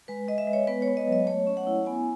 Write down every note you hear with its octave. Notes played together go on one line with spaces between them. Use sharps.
G#3 B4
G#3 D#5
E5
G#3
C#5
B3 B4
C#5
B3
D#5
F#3
D#5
A3 C#5
C#4
F#5
E4
B3 G#5